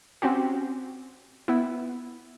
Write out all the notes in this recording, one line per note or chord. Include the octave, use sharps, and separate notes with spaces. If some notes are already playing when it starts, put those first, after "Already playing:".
C4 C#4 F#4 G4
B3 E4